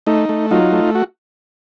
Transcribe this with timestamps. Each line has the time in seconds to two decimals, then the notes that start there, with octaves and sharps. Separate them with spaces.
0.07 A3 D#4
0.29 A3
0.51 F#3 D#4 F4
0.72 A3
0.95 F#4